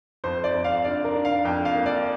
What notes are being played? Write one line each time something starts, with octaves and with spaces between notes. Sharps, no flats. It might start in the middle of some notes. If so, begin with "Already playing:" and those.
F2 C5
D5
F2
F5
D4 D5
A#4
D4
F5
F2 G5
F5
A#3
D5